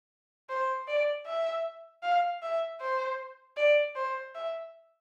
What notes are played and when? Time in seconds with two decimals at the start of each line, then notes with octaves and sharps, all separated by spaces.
0.50 C5
0.88 D5
1.27 E5
2.03 F5
2.43 E5
2.81 C5
3.57 D5
3.96 C5
4.35 E5